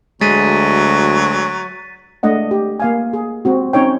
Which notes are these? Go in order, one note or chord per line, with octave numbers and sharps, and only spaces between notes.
D2 F#3 G#3 A6 B6 D#7
G#3 A3 D4 D#5 F#5
G4
A#3 F5 G#5
G#4
G#3 C4 F#4
C4 C#4 D#4 C#5 G5